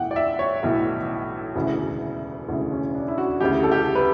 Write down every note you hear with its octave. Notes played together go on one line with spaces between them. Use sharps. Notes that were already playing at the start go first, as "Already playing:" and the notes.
Already playing: B1 A2 E3 F#5 G5
D5
E5
C#5
B1 A2 E3
E1 D2 C#3 E3
E1 D2 C#3 E3
C#4
D4
E4
F#4
D2 C#3 E3 G4
A4
G4
B4